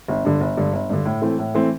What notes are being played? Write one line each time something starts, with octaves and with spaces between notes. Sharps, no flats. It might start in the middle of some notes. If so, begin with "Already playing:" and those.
G1
G2 D3
G1
G2 D3
G1
G2 D3
A2
E3 A3 C4
A2
E3 A3 C4